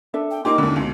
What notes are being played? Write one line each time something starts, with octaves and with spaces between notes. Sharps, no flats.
D4 A4 E5
G5
A#3 D#4 F4 G4 D#5 D6
D#2 D3 C#4 D#4 E4
C#2 B2